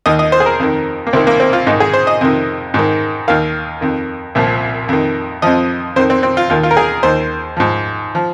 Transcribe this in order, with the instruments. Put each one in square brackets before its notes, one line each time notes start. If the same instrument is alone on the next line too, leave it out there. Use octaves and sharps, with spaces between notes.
[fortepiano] D#2 D#3 D#5
D#5
C5
G#4
A#4
F2 D#3
A#3
C2 C3 D#3 C4
A#3
C4
F4
G#2 D#3 D#4
G#4
C5
D#5
F2 C3 D#3
G#2 D#3
D#2 D#3 F5
F2 D#3
C2 A#2 F3
F2 D#3
F2 F3 D#5
F2 C5
D#3
C4
C4
F4
D#2 D#3 F4
F4
A#4
G#4
D#2 D#3 C5
G#2 F3
F3